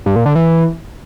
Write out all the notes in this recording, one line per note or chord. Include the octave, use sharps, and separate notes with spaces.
G2
A#2
D3
E3